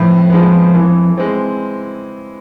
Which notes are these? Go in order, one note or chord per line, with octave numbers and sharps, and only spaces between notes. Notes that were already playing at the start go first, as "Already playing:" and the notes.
Already playing: F2 A2 G#3 B3
F3 G#3 B3
E3
G#3 C4